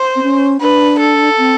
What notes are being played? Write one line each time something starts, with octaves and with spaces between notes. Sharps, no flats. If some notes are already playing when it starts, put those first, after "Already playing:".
Already playing: C5
C4
C#4
D4 B4
A4
C4